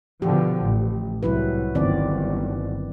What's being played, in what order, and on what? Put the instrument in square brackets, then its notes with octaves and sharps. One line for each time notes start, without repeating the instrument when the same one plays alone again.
[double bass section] B2 D3 F3 [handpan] G4
[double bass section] A1
[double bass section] C2 [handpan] F#3 E4 B4
[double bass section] G1 [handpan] D#3 C4 D5